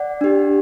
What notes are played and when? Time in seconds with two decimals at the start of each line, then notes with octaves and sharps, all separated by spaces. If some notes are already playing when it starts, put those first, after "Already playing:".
Already playing: D5 F#5
0.21 D4 G4